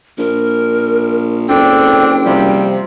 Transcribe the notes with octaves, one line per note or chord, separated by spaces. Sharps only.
A#1 A#4
F#1 C4 D4 A4 G5
C3 F3 G3